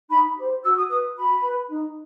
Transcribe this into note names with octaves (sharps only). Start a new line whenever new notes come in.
D#4 B5
G4 C5
F#4 E6
D#6
B4 D#6
F#4 B5
B4
D#4